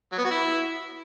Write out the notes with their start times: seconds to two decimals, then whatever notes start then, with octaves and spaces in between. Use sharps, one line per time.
0.12 F#3
0.18 B3
0.25 F#4
0.31 E4